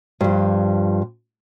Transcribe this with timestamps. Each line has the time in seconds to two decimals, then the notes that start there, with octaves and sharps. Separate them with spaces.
0.21 G2 F3